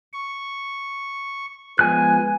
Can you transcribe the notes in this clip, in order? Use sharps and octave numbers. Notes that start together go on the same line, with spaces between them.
C#6
F3 G#3 B3 G#5 F#6